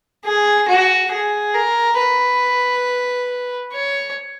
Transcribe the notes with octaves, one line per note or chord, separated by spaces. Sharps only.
G#4
F#4
G#4
A#4
B4
C#5